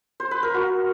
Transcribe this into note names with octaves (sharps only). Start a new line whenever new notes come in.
C5
B4
A#4
F#4